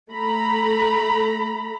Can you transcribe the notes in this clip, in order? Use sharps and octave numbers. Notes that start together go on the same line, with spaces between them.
A3 A#5 B5